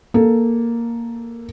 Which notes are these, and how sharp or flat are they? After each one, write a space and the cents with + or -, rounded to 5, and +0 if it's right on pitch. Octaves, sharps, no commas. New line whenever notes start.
A#3 +0 A4 +0